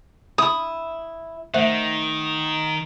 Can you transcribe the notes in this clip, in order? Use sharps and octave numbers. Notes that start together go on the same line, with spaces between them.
E4 D#6
D#3 A3 C5 E5 F#5